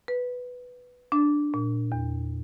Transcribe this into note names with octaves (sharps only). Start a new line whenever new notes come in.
B4
D4
A#2
E2